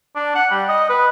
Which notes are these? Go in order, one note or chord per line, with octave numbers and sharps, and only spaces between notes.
D4
F#5
G3
D#5
B4